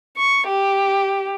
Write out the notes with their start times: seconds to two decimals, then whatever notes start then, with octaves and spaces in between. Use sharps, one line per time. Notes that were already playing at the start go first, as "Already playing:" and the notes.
0.17 C#6
0.47 G4